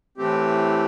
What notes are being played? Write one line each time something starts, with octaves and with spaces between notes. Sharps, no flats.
A2 E3 A3 C4 G4